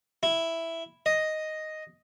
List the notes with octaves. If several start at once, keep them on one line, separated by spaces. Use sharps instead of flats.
E4
D#5